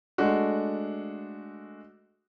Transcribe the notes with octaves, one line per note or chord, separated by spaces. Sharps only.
G#3 A3 D4 F#4